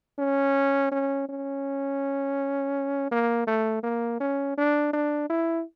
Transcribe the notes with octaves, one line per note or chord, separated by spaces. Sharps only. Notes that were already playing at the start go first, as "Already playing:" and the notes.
C#4
C#4
C#4
A#3
A3
A#3
C#4
D4
D4
E4